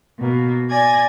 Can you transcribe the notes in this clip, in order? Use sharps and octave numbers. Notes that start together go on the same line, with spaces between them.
B2 A#3
D5 G#5 G#6 A#6